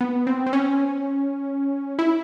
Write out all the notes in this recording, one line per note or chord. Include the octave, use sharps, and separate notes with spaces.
B3
C4
C4
C#4
E4